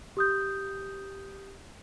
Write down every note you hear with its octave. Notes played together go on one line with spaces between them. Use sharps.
G4 D#6 G6